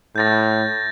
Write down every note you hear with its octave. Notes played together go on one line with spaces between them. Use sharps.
A2 G6 A6 A#6